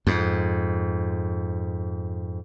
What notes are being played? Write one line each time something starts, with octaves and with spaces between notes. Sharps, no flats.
F2 G#2